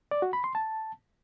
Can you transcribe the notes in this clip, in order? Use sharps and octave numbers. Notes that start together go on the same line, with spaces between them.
D5
F#4
B5
C6
A5